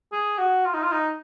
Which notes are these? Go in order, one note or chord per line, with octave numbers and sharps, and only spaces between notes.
G#4
F#4
F4
D#4
F4
D#4